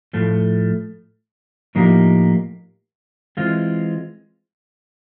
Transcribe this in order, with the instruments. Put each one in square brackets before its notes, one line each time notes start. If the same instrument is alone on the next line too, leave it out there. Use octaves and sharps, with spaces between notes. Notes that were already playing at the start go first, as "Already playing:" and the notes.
[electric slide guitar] A2 F3 A3
A2 F3 A#3 D#4 G4
E3 G#3 C4 F4